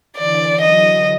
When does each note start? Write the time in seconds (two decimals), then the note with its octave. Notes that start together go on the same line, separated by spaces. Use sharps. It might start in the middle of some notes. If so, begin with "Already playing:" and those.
0.18 D3 E3 D5
0.61 E3 F#3 D#5